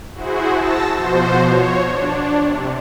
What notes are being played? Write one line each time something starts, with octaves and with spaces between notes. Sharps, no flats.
E4 F#4 G#4 C5
A5 E6 A#6
B2 F3 F#4 C5
C#5
D4
C3